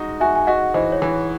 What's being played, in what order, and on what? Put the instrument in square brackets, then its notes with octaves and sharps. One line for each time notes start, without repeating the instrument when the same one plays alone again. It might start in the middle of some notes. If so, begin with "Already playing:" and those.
Already playing: [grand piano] G#3 D#4 F#4
[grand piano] F#4 [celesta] E5 G#5
[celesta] G#5
[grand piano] F#4 [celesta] D#5 F#5
[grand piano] E3 [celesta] C5 D#5
[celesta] C#5
[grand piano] E3
[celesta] C#5